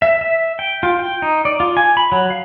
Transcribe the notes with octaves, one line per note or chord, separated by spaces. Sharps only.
E5
E5
G5
F4
G5
D#4
D5
F4
G#5
B5
F#3
F5